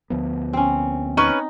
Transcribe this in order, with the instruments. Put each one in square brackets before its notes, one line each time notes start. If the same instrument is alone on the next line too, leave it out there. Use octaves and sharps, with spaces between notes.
[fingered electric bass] D2 F3 B3
[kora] C4 C#4
[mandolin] C#4 B4 C#6 [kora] D#4